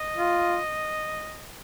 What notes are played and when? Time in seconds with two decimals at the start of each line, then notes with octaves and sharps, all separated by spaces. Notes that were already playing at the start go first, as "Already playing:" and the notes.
Already playing: D#5
0.17 F4